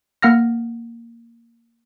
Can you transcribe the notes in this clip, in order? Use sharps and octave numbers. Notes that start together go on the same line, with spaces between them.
A#3 F#5 F6 A#6